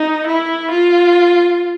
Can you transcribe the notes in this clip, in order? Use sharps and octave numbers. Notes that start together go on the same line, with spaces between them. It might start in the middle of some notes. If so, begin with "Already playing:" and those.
Already playing: D#4
E4
F4